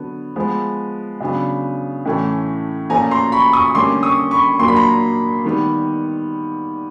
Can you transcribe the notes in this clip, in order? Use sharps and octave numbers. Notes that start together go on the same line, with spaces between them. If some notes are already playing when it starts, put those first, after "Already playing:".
Already playing: D3 F#3 B3
F3 G#3 B3
C#3 F#3 B3 D4
A2 E3 A3 C#4
A#2 F3 A3 C#4 G#5 A#5
A#5 C6
B5 C#6
C#6 D#6
D3 G3 A#3 C#4 C6 D6
C#6 D#6
B5 C#6
A#2 F#3 A#3 D4 C6
B5
A#5 C6
D#3 G3 B3